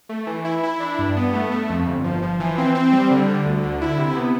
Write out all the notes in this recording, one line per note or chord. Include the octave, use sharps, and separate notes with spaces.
A3
E3
E4
E4
D4
G2
B3
A3
A3
F2
G1
F3
F3
E3
C4
C4
G3
D3
D3
D2
D3
E4
C3
B3